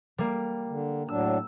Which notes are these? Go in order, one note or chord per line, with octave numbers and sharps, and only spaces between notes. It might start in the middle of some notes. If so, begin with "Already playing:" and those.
G3 A#3
D3
A2 F#3 D4 E6